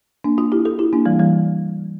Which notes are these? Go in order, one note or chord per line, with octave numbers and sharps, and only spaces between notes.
A#3 D4
D4 F4
E4 G4
F4 A4
E4 G4
A#3 D4
E3 G3
E3 G3